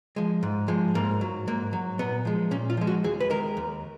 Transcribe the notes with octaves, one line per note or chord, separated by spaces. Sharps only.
F3 G#3
G#2
F3 G#3
G#2 A#3
F#3
G#2 A#3
F#3
A#2 B3
F3 G#3
A#2 C#4
F4
F3 G#3
F#4
D#2 G#4
B4
D#3 G#3 A#4
D#2